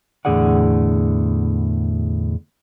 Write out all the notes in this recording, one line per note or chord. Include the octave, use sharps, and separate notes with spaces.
E2 A2 D3 G#4 D5 F#5